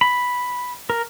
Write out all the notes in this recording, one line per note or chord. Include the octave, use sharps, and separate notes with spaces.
B5
A#4